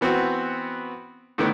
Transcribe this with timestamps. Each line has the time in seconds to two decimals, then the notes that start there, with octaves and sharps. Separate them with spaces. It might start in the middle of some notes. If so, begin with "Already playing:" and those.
0.01 E3 B3 C4 F#4
1.38 A2 D3 D#3 A3 B3